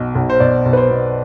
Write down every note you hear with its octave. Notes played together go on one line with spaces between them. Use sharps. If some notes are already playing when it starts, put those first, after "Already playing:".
Already playing: B1 B2
B1
C5
B2 D5
B1
B4
C5
B2